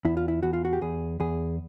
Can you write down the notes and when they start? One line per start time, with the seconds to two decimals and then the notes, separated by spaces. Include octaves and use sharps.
0.05 E2 E4
0.17 F4
0.28 E4
0.43 E2 F#4
0.53 F4
0.65 F#4
0.73 G4
0.81 E2 G#4
1.20 E2 G#4